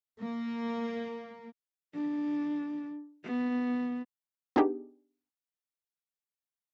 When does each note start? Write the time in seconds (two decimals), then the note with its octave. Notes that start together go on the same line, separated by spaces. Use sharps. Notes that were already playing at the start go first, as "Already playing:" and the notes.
0.21 A#3
1.94 D4
3.24 B3
4.56 B3 D4 D#4 G4 G#4